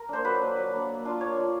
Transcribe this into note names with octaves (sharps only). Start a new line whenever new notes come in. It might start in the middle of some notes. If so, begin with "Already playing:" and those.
Already playing: A#4
A#3 D4 C5
F#3 B4
A#3 D4
F#3
A#3 D4
A#3
D4 F4
A#3 C#5
D4 F4